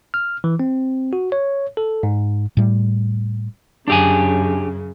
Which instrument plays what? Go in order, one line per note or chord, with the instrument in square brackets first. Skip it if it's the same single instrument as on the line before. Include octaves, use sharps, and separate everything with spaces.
[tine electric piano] F6
E3
C4
F#4
C#5
A4
G#2
[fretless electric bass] A2 G3
[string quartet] F#2 C#3 [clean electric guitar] D4 G4 G#5